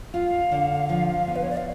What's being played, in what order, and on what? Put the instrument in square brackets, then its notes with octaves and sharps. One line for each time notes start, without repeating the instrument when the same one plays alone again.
[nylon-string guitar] F4 [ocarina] F5
[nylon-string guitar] D3
F3
B3
[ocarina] B4
C#5
D5
F5